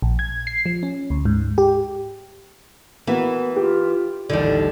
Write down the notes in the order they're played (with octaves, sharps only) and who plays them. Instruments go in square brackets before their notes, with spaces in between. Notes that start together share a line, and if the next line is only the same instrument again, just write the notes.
[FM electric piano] A#1
G#6
C7
F3
C#4
D2
G#2
G4
[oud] E3 [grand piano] A#3 B3 F#4
[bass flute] F4 [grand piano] G4
[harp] A1 D#2 G#6 [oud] D3 G3 [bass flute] D5